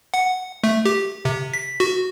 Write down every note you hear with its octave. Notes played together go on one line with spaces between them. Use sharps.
F#5
A3
G4
C3
B6
F#4